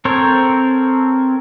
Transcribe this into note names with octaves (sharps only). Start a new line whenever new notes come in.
C4 A4 A#4 C5 C#5